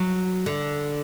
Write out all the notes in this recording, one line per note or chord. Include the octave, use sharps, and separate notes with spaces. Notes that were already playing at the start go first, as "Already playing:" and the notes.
Already playing: F#3
D3